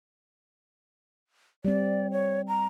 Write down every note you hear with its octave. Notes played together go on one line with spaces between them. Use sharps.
G3 C4 D5
C#5
A#5